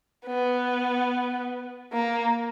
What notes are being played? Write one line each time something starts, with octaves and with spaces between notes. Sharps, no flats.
B3
A#3